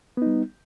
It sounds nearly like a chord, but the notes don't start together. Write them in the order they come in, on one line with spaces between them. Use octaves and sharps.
B3 D#4 G3